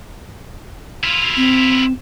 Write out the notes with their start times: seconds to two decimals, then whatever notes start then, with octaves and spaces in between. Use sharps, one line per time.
1.03 E4 F4
1.37 C4